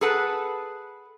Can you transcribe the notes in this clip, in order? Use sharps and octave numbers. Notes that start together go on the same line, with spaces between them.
G#4 A4 B4 F#5 A5